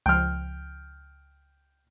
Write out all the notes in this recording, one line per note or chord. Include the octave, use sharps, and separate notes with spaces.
C#2 F3 G5 C6 F6